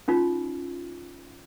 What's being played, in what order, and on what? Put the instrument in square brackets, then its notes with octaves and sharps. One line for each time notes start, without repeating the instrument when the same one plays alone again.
[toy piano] C#4 D#4 F4 F#4